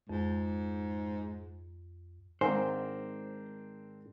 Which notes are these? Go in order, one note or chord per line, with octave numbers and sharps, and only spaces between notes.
F2 G#2
G#2 D#3 G#3 C4 D4 A#4 C5 G#5